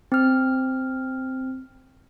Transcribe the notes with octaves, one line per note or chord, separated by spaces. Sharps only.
C4 F6